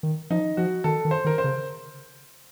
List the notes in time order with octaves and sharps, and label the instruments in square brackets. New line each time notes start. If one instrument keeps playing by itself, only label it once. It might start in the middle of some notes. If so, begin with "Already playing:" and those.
[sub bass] D#3
[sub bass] F3 [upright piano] D#4
[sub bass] F3 [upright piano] F#4
[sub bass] D#3 [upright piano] A4
[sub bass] D#3
[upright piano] C5
[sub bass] D#3 [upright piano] A#4
[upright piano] C5
[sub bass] C#3